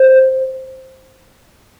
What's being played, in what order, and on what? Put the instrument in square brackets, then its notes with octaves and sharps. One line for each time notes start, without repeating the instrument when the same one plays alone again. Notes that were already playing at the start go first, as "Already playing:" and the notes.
Already playing: [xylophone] C5